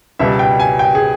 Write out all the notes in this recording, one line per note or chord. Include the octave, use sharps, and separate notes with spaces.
C#2 B2 G3 E5
G5
G#5
G5
G#4